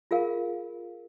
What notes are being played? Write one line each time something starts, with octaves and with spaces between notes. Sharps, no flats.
F4 G#4 A#4 F5